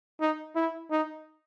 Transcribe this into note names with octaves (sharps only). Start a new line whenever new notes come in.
D#4
E4
D#4